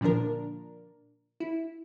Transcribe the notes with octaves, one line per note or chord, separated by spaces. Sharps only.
A#2 D3 F3 D4 A#4
E4